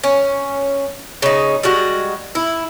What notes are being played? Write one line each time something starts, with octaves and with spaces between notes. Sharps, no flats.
C#4
C#3 D#4
G3 G#3 F#4
E4